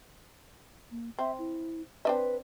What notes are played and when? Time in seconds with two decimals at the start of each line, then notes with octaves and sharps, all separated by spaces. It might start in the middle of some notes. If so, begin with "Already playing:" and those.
0.91 A#3
1.19 C4 E5
1.38 E4
2.05 C4 D4 B4 E5